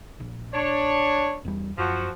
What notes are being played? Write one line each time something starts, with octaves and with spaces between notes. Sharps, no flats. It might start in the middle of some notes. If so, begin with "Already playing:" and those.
A#1
D4 C#5
E2 G3
F#2 F3 F#4